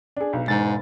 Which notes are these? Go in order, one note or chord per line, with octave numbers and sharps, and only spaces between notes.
D4 G#4
B1
E1 G#2 A6